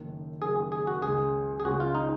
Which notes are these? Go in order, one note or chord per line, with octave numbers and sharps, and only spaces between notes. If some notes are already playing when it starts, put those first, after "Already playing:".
Already playing: F#1 F#2 D#3
F#1 F#2 D#3 G#4
G#4
F#4
C#2 C#3 G#3 G#4
G#4
C#2 C#3 G#3 F#4
F4
D#4